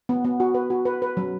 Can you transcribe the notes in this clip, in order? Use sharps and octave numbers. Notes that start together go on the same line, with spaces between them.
B3
B3
F#4
B4
F#4
B4
B4
F#3